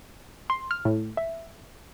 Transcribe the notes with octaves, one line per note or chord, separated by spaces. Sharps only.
C6
F6
A2
E5